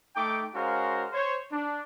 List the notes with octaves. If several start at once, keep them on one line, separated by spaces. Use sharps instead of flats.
A3 D#4 G5 D6
G#3 C#4 F#4 A#4 C5 F5
C5 C#5
D4